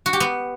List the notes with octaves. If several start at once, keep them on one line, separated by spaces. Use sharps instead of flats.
F#4
G4
B3